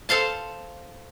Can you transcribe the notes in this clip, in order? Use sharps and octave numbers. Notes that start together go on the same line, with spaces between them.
A4 C5 F5 A5